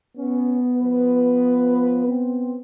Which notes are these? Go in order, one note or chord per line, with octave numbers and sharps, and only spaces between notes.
B3 C#4
F3 B4
C4